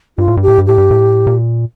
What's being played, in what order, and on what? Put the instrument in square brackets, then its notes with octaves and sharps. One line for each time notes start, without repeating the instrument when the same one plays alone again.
[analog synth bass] G2 [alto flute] F4
[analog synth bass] A2
G2
[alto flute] G4
[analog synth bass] A2
G2
[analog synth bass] A2 [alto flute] G4
[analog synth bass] G2
A2
A#2